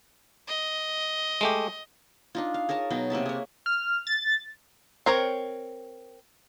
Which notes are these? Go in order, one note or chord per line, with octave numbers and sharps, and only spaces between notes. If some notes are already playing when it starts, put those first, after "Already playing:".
D#5
G#3 A3 G4
D4 D#4 F4
F5
G#4 A#4 C#5 A5
B2 F#3 D#4
C3 A#3 E5 A5
G#4 C#5
F6
A6
C4 A#4 C#5